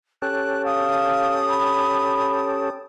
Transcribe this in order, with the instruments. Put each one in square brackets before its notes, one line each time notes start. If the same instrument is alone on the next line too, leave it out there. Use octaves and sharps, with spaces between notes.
[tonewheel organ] C#4 G4 A4 [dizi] F#6
[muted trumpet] F5 [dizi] D#6
[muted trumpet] B5